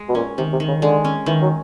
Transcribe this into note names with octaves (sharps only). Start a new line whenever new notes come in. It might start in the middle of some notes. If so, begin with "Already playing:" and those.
Already playing: G#3
B2
A#2 C#4
C3 D#3
C3
D#3
C#3
D3 G#3
C#4
D#3 E3
F#3